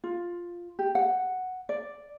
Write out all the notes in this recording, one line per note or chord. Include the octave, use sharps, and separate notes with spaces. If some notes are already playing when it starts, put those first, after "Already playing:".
F4
G4
F#5
D5